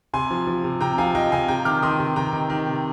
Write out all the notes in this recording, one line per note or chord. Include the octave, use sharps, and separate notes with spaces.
C3 G#5 C6
F3
F3
C3
C3 G5 A#5
F3 F5 G#5
F3 D#5 G5
C3 F5 G#5
C3 G5 A#5
D#3 D6 F6
D#3 C6 D#6
C3
C3 G5 A#5
D#3
D#3
C3